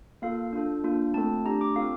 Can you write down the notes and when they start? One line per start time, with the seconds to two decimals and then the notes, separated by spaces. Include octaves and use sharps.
0.22 A#3 F4 A4 F5
0.53 D4 F4 A4
0.84 A#3 D4 F4
1.14 A3 C4 F4 A4 A5
1.45 A3 D4 G4 A#5
1.61 D6
1.76 C4 F4 A4 F5